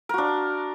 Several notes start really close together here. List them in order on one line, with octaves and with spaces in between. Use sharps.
A#4 F#4 D4